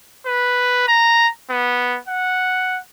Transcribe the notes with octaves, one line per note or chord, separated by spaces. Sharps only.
B4
A#5
B3
F#5